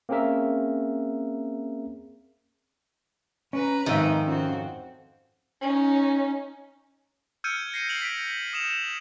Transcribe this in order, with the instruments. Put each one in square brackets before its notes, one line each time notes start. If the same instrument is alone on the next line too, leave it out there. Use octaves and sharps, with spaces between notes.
[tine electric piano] A#3 C4 C#4 G#4 A#4 E5
[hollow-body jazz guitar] C#4 [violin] B4 A#5
[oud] F2 G#2 E5 [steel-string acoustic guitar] D#3 [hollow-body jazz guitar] C4 D#4
[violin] C4 F#4 [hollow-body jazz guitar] C#4 F4
[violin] C#4 D#4
[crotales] E6 F6 G6 G#6 C#7 D#7
A#6 C7 D#7
C7 D7 F7 F#7
B6 D7
D#6 E7 F7